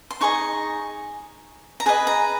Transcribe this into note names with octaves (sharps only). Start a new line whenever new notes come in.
C6
D#4 G#4 D#5 C#6
A#5
G#4 B4 D#5 B5
A#5